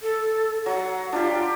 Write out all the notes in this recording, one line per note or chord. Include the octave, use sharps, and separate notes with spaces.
A4
F#3 F#5
D4 F4 G4